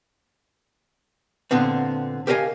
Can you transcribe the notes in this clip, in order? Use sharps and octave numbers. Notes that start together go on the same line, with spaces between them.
A#2 D3 B3 C4
G4 A#4 C5 D#5 F5 G#5